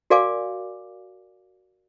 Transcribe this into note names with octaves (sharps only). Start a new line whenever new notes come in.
F#4 A#4 D5 F5 G#5 D6